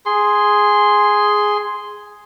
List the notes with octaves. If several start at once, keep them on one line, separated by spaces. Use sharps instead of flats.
G#4 C6